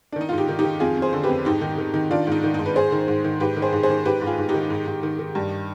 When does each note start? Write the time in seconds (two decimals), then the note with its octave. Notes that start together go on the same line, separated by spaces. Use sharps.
0.12 D4
0.16 D#3 D#4
0.29 G#2 F4
0.38 D#4 G4
0.48 D#3
0.59 D#4 G4
0.64 D#3
0.80 F2 F4 G#4
0.97 F2
1.02 G#4 C5
1.13 D3
1.23 G4 B4
1.29 F2
1.45 G#2 D#4 G4
1.61 D#3
1.78 D#3
1.94 D#3
2.11 D#3 D4 F4
2.27 G#2 D#4
2.44 D#3
2.54 G#2 D#4
2.66 B4
2.76 G#2 G#4 C5
2.92 D#3
3.08 G#2
3.24 D#3
3.40 G#2 G4 B4
3.57 D#3
3.62 G#4 C5
3.73 G#2
3.83 G#4 C5
3.89 D#3
4.05 G#2 G4 B4
4.21 G#2
4.26 F4 G#4
4.38 G#2
4.49 D#4 G4
4.54 D#3
4.70 G#2
4.87 G#2
5.03 D#3
5.19 D#3
5.35 G2